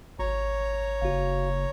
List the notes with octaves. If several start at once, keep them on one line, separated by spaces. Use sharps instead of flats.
G#1 C#5 A#5 C#6
F#1 F#4 F5